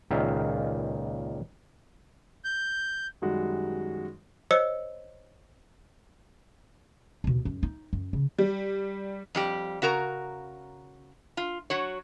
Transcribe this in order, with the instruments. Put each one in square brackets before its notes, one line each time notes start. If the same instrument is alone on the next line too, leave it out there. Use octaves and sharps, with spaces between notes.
[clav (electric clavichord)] C#2 A#2 D#3 E5 F5
[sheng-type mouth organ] G6
[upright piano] F#2 D#3 G3 G#3 F#4
[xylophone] C5 C#5 D#5 E6 C#7
[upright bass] D#2 B2
F#2
D#4
F#2
C#3
[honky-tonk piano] G3
[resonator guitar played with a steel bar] F2 G3 G4
C#3 F#4 A#4 A#5
F4
F#3 F#4 C#5